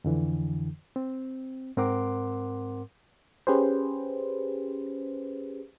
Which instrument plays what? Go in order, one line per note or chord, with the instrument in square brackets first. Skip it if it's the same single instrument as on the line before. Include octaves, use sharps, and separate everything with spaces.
[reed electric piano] F2 D3 E3
C4
G#2 C4 A#4 F#5 C6 D6
[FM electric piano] C#4 G4 G#4 B4 C5